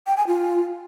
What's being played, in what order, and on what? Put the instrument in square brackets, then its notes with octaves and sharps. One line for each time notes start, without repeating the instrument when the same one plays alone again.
[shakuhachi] G5
G#5
F4